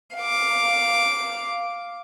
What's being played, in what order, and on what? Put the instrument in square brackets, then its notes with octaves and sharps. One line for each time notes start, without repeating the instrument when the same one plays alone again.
[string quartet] F5 D6